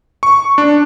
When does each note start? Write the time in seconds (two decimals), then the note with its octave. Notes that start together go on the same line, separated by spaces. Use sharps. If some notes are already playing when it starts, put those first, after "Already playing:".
0.23 C#6
0.58 D4